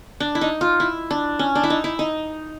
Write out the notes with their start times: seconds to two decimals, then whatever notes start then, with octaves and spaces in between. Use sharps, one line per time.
0.20 D4
0.35 E4
0.41 D#4
0.61 F4
0.80 E4
1.11 D4
1.39 C#4
1.55 D4
1.63 E4
1.70 D#4
1.84 E4
1.99 D#4